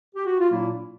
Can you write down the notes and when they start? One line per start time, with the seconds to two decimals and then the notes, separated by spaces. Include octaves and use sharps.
0.16 G4
0.26 F#4
0.39 F4
0.50 A#2 F#3 A#3 D4 E4